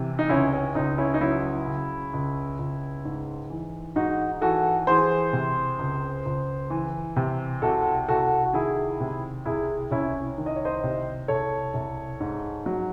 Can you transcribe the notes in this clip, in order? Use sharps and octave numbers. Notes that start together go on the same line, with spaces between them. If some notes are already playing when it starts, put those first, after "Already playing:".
Already playing: C3 E3
D#4
C#2 C#4 E4
C#4
C#2 D#4
C#4 E4
D#4
F#3 C#4 E4
C#3
C#2
C#2
G#2
E3
G#2 D#4 F#4
E3 F#4 A4
E3 G#4 C5
C3
C#2
C#2
E3
C3
C2 F#4 A4
C2 F#4 A4
F#4
D#3 E4 G#4
C3
C2 E4 G#4
C2 C#4 E4
D#3
D#5
C#5
C5 D#5
C3
C2 A4 C#5
C2
G#2
F#3